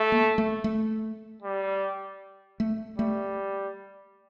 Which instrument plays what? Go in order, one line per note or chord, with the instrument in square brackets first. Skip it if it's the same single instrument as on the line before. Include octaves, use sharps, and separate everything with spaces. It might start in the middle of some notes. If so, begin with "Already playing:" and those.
Already playing: [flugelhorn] A3
[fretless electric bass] A#3
A3
A3
[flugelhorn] G3
[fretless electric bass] A3
[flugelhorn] G3 [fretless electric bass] A3